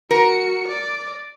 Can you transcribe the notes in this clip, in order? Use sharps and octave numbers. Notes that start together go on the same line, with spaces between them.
F#4 A#4 C#7
D5